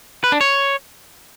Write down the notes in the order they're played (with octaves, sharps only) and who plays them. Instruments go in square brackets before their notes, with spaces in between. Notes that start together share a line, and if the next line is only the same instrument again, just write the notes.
[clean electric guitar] B4
D4
C#5